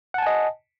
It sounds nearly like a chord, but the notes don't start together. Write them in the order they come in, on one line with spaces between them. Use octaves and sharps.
F#5 A5 G#5 D#5